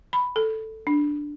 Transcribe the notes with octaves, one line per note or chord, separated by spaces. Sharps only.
B5
A4
D4